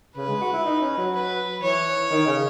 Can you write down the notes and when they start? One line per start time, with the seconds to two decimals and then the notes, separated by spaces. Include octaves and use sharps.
0.16 C#3 B4
0.29 G#3
0.41 F#4
0.53 E4
0.65 D#4
0.81 C#4
0.98 F#3
1.13 B4
1.62 E3 C#5
2.11 D#3
2.27 C#3